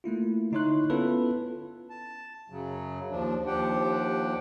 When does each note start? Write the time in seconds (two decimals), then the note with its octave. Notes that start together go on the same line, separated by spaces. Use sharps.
0.04 A3 A#3 E4 F4
0.52 D3 D#4 E4 C#5 C6 F#6
0.90 B3 C#4 E4 F4 A4 B4
1.90 A5
2.50 F#2 C#3 F#3
3.11 D#2 F3 D4
3.47 D#2 F3 D4 G4 F#5 G5